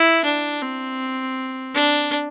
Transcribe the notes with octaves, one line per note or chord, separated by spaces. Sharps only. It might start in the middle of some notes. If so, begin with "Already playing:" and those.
Already playing: E4
D4
C4
D4